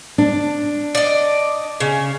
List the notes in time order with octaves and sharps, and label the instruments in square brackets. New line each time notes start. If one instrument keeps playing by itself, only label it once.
[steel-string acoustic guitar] D4
[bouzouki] D5 D#5
C#3